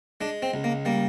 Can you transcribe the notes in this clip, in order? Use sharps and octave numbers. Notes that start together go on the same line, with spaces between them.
G#3 D4
C4
C#2
A#3
G3 A#3